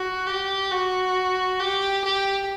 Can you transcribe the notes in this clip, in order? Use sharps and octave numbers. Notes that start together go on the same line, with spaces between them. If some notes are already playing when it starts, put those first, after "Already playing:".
Already playing: F#4
G4
F#4
G4
G4